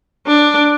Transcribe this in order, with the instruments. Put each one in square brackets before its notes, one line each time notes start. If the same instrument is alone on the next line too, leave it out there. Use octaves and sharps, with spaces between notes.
[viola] D4